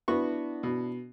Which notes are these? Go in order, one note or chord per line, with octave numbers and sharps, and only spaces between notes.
B3 D4 E4 F#4 C#6
B2